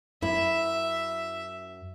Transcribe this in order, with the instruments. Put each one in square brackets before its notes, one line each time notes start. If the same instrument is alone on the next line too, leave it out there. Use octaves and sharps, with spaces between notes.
[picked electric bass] F#2 [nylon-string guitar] E4 [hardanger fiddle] E5